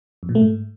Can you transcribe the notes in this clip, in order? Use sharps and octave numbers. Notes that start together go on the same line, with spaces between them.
F2
A#2
A3
G#2